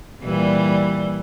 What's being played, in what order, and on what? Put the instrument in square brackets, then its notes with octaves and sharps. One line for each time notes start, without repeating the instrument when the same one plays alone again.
[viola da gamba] A#2 E3 G3